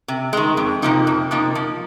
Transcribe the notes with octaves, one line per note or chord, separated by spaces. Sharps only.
C3
D#3 G#3
F2
C3 F3 A#3 D#4
F2
C3 F3 A#3 D#4
F3